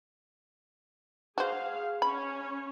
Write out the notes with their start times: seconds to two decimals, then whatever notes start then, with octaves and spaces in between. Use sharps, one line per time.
1.38 F#4 G#4 C5 F5
2.02 C#4 C#5 B5